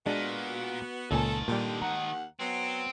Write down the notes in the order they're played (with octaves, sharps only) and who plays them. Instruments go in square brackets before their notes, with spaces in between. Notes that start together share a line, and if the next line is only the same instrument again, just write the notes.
[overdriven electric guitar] A#2 [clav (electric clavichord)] G#3 D4 [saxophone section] B3 F#4
[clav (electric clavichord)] C#2 A#2 G#5 [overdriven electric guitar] D#3 A5 [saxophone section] A4
[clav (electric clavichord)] A#2 G3 [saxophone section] D3 G4
[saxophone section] D#2 F#5 [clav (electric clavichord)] A#5
[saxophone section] F#3 B3 [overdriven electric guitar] C4